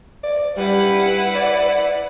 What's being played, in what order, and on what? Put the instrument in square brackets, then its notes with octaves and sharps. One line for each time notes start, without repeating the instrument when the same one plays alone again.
[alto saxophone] D5
[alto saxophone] G3 [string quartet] E4 B4 F#5
[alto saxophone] D5